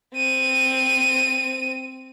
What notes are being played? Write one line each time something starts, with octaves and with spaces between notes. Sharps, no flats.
C4 D#7